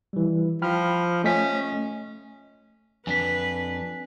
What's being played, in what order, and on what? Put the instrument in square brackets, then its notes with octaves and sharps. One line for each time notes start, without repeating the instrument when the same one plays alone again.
[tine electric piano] E3 G3
[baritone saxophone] F3 [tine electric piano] G5 B5 F6
[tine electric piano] A3 D#5 B6 [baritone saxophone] C#4
[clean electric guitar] F2 D4 [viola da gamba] B4 [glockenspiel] G#5 B6